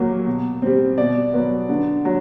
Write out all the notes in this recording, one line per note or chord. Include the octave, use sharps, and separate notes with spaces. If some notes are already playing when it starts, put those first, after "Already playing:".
Already playing: A#2 F#3 A#3
B2
G3 C4
B2 D5
F#3 B3
D3
F#3